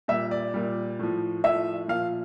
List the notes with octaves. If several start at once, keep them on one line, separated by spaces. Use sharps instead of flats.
A#2 G3 E5
D5
A#2 G3
A2 F3
A2 F3 E5
A#2 F3 F5